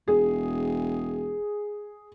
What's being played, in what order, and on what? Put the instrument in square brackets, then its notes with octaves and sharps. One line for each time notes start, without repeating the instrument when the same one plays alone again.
[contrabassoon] E1 [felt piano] G#4